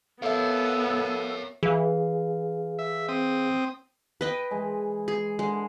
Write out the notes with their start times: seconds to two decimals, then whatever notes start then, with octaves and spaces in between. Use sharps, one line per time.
0.22 B3 A4 A#4 C#5 E5 F5
1.63 E3 G#4 F5
2.79 E5
3.09 C4 D#6
4.21 B4 D#5 G5
4.51 E3 G#3
5.08 G#4
5.39 D3 E3 G#3